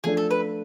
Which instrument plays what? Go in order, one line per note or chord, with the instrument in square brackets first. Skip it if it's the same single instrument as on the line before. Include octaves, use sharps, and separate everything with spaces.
[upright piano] F3 A3 D4 [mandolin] G#4
[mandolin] A4
B4